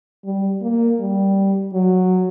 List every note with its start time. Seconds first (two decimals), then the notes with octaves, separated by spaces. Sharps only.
0.24 G3
0.62 A#3
0.99 G3
1.74 F#3